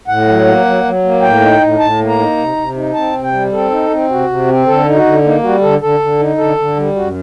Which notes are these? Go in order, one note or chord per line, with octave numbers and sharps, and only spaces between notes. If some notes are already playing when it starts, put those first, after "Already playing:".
A2 F#5
F#3
A#3
F#3
F#3
A#3
A2 G5
D#4
A2
A2 A5
A#3
A#5
D#4
C3
C3
D#4
C4 A5
C3
G5
G3
C4 A4
D#4
C4
C3 F#4
C3
C4
D3 A4
D#4
F#4
D3
A#3 D#4
G3 F#4
D3 A4
D3 A4
D3
D#4
D3 A4
D3
G3
F#2 F#4